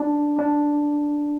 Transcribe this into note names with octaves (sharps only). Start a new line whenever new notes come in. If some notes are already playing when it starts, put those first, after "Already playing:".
Already playing: D4
D4